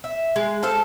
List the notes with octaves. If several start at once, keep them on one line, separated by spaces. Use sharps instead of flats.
E5
G#3
A4 C5 F5 A5